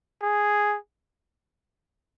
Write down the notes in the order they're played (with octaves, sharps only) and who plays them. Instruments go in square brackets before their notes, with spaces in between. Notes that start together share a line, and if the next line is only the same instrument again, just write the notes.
[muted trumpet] G#4